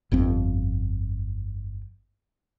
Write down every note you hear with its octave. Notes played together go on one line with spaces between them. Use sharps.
G1 F2 C4